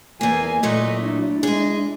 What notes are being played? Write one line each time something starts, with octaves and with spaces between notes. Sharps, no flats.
E2 A#3 G#5
A#2 F#3 A3 D#5
D4 E4
G#3 G#4